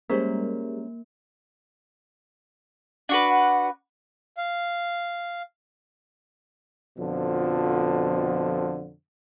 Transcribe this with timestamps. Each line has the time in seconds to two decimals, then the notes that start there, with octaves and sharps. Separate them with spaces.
0.10 G3 G#3 A#3 C#4 A#4 C5
3.09 D4 F#4 B4
3.29 F#5
4.37 F5
6.97 F2 B2 D3 F3